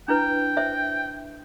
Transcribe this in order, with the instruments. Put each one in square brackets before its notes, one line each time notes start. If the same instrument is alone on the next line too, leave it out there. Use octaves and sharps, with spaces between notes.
[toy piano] D4 E4 B4 [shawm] G5
[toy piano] C5 E5